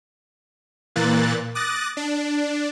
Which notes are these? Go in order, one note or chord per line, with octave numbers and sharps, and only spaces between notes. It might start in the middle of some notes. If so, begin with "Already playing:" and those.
A#2 E3 A#3 F#6 A6
D6 D#6 F#6 A6 A#6
D4